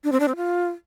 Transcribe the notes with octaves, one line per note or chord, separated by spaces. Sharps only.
D4
C4
D4
C4
F4